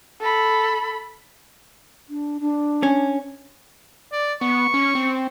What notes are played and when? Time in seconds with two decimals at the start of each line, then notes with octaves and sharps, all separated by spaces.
0.21 A4 B5
2.09 D4
2.41 D4
2.83 C#4
4.12 D5
4.41 B3 C#6
4.74 C#4
4.95 C4